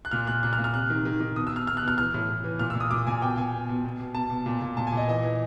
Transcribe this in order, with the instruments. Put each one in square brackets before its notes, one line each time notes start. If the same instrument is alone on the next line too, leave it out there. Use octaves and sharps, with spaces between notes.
[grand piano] F#6
A#2 F6
A#2 F#6
A#2 F#6
F6
A#2
F6
C3 F#6
D#3
D#3
D#3
B2 D#6
E6
B2 F6
B2 F6
F#6
B2
F6
E3 F6
A2
A2
E3
A#2 F6
E6
A#2
D#6
A#2 D6
A#2 G#5
B2 G5
B2 G#5
B2
B2
B2
B2
B2 A5
B2
A#2
A#2
A#2 A5
G#5
A#2 D#5
E3 D#5
E3